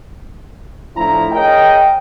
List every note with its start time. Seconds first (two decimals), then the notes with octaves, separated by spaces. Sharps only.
0.96 A2 F3 A3 D4 E4 A#5
1.32 G#4 A#4 C#5 D#5 G5